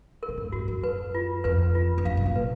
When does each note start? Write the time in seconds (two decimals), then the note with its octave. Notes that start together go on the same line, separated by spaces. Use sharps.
0.23 A#4
0.29 A#2
0.38 G#2
0.52 G#2 F#4
0.68 F#2
0.84 B4
1.15 F4
1.44 F2 B4
1.75 F4
1.98 F2
2.05 F#2 F5
2.17 B2
2.26 A#2
2.36 B4